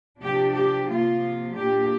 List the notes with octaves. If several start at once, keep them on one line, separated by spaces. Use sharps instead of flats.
C3 F3 D4 G4
G4
C3 F3 A#3 F4
A#2 A#3 D4 G4